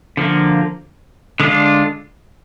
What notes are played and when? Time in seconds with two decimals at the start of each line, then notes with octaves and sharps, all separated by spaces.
0.17 D3 F3 A#3
1.40 D3 G#3 D4 F4